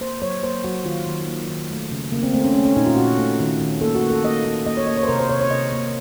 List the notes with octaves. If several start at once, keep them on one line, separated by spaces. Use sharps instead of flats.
A#3 C5
F#3 C#5
A#3 C5
F#3 F#4
D#3 F4
D#3
A#3
D#3
A3
C#3
C#3 A#3
C4
A3 C4
C#4
A3 C#4
C#4
A#2 D#4
F4
A#2 F#4
A3
D#3
D#3
A#3 A4
F#4
A#3
A4
A#3 D#5
A#3
A#3 D#5
C#5
A#3 D#5
C#5
C5
C3 A#4
C5
C3 C#5
C#5
C3 D#5
A#3